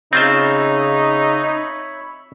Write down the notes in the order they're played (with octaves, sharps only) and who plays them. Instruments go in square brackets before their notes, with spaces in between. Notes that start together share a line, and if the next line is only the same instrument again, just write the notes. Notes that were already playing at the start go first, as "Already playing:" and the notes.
[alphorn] C#3 [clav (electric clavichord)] C4 F4 C5 [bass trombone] D#4 [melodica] C#5 E5 B5